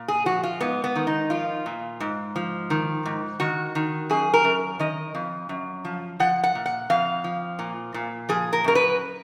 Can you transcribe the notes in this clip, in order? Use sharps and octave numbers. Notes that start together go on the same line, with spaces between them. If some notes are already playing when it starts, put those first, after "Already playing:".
Already playing: A#2
G#4
F3 F#4
F4
G#2 B3
B3
D#3
D#4
F3 F4
A#2
G#2
F3
D#3
G#2
D#3 F#4
D#3
F#2 G#4
A#4
F#2
D#3 D#5
F2
F#2
F3
F3 F#5
F#5
A#2
F#5
F2 F5
F3
A#2
A#2
F3 G#4
A#4
F#2 A#4
B4